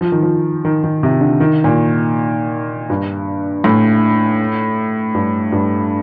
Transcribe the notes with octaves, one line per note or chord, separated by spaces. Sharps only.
F3
D#3
F3
D#3
D#3
C3
D3
D#3
A#2
G2
A2
G2
G2